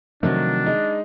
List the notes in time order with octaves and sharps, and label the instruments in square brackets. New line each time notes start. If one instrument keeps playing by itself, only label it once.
[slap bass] C3 F3 A3 [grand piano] D#3 F#3 [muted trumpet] D4
[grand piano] G#3 D#4